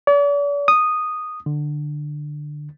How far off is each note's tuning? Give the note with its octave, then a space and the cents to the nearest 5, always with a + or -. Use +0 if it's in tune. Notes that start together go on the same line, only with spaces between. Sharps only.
D5 -45
D#6 -10
D3 +15